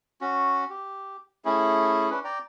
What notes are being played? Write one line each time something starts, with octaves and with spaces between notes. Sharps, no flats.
C#4 F#4
G4
A3 C#4 E4 G#4
C#4 D4 B4
D5 G5 A#5